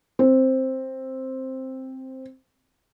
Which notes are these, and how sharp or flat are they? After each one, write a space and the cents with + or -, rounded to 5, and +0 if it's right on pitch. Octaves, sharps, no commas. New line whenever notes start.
C4 +5